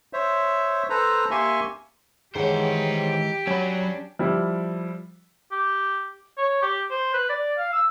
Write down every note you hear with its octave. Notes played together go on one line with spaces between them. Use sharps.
C5 C#5 E5
A4 B4 C5 A#5
A#3 G4 E5 G#5 C6 C#6
D#3 E3 G#3 G4 G#4 C5 C#5 F#5
F#3 C#4 D4 C#5 B5
F3 G3 E4
G4
C#5
G4
C5
B4
D5
F5
E6